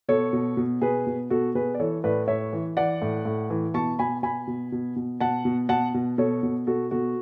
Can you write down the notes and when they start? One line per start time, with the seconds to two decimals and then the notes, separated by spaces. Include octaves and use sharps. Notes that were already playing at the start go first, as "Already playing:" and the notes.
0.08 B2 A4 C#5
0.33 B2
0.57 B2
0.81 B2 G#4 B4
1.07 B2
1.30 B2 F#4 A4
1.55 B2 G#4 B4
1.75 D5
1.79 E3 A4 C#5
2.04 A2 B4 D5
2.28 A2 C#5 E5
2.53 E3
2.77 E3 D5 F#5
3.02 A2
3.25 A2
3.50 E3
3.74 B2 A5 C#6
3.99 B2 G#5 B5
4.23 B2 G#5 B5
4.47 B2
4.72 B2
4.96 B2
5.20 B2 F#5 A5
5.45 B2
5.69 B2 F#5 A5
5.94 B2
6.18 B2 A4 C#5
6.43 B2
6.67 B2 F#4 A4
6.91 B2 F#4 A4